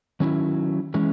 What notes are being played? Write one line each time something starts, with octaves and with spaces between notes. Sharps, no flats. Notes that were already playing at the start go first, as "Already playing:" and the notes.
D#3 F#3 C#4 E4
E3 G#3 C#4